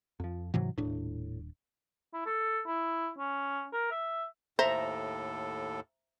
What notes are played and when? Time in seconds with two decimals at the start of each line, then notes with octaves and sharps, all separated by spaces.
0.20 F2 F3
0.54 G#2 C3 E3 F#3
0.78 D#1 A2 D4
2.14 E4
2.27 A4
2.67 E4
3.19 C#4
3.73 A#4
3.91 E5
4.59 D#2 A2 A4 C5 E5 A#5